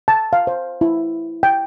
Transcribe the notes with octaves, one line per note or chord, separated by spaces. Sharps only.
A5
F5
C5
E4
G5